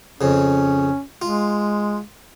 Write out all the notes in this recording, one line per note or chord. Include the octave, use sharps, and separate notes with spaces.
F2 C#3 C#4
G#3 F4